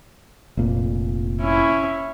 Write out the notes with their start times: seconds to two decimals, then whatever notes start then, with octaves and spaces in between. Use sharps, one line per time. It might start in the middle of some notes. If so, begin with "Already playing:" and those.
0.57 F1 A#2
1.41 C#4 E4